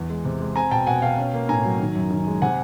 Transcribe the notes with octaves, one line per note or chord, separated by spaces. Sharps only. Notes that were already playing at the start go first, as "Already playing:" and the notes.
Already playing: E2
G#3
C3
G#3
C4 G#5 A#5
B2 G5 A5
B2 F#5 G#5
B2 F5 G5
C#4
A#3
A2 G#5 A#5
F#3
D#3
F#2
D#3
G#3
C3 F#5 G#5